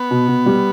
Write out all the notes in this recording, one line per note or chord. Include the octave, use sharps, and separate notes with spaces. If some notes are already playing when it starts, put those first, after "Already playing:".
Already playing: B3
B2
B2
G3